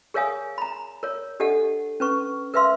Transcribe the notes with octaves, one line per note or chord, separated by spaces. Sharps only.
G#4 A#4 C#5 F5 G#5 D#6
A#5 B5
A#4 C#5
D4 G4 A4 D#5 F#5
C#4 B4 C#6
A#4 B4 E5 F5 C6 E6